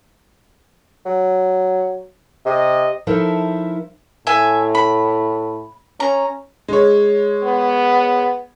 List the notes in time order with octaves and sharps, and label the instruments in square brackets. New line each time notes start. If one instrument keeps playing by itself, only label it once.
[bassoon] F#3
[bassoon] C3 [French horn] D#5
[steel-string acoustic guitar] F3 D#4 E4 A4 A#4 E5
[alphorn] A2 [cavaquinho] E5 G#5
[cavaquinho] B5
[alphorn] C#4 [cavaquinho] A#5
[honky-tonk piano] G#3 C#5
[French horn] B3